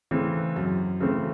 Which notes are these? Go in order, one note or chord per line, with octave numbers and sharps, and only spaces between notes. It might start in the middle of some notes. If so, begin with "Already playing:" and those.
C#3 E3 A3 C4
F#2
C#3 E3 A3 C4